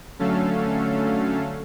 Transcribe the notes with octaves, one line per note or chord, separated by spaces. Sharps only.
D3 F#3 A3 C#4 A4 F5